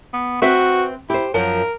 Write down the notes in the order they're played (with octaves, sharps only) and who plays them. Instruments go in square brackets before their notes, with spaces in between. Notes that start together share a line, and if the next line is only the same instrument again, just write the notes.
[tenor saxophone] B3
[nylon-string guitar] C4 B4 E5 [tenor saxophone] F#4
[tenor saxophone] E4 [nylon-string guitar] G4 C5
[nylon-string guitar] F#2 F3 [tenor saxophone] A#4